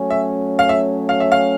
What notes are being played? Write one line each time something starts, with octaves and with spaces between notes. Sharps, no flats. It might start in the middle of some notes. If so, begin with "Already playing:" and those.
Already playing: F#3 A3 C#4
E5
F5
E5
F5
E5
F5